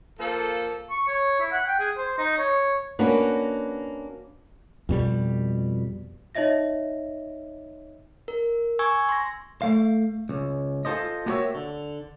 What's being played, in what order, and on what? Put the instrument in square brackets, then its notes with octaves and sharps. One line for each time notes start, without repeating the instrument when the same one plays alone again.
[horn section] F3 A#3 A4
[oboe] C#6
C#5
E4
F#5
G5
G#4
C5
D#4
C#5
[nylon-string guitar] A#3 C#4 D4 F#4 B4
[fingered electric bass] F2 B2 G3
[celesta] D#4 C#5 D#5 E5 A#6
[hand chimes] A#4
G#5 C#6 E6 G#6
C6 A#6
[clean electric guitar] A3 F5
C#2
F4 G4 A4 C5 D#5
A#3 B3 F#4 G4 C#5 E5
D3